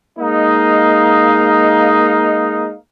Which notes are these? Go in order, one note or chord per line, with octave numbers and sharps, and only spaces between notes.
G#3 A#3 D#4 D#5 F5